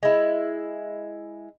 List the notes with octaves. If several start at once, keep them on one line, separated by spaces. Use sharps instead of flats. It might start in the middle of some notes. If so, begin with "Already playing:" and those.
G#3 E4